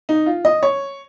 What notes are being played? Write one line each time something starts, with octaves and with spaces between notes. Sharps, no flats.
D#4
F4
D#5
C#5